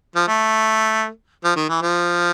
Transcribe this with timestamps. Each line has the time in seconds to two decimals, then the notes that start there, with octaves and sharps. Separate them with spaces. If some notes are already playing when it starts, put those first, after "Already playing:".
0.15 F3
0.28 A3
1.44 F3
1.56 D#3
1.69 E3
1.82 F3